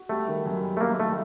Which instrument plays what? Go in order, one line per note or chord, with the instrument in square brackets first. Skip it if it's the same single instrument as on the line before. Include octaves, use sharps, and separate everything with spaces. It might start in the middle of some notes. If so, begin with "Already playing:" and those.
Already playing: [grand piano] F#4
[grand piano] G3 [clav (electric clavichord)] A3
[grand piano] D#3
F#2
G3
[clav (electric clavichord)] A3
[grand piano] G3 [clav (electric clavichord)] A#3
[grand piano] D#3 [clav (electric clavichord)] A3